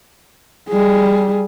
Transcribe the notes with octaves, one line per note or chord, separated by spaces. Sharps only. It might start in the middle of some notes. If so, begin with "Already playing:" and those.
G3 G#4